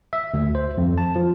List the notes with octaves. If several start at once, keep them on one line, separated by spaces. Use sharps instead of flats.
E5
D2
C5
F2
A5
F3